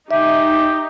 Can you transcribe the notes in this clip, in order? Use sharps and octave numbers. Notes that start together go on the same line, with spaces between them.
D#4 G4 E5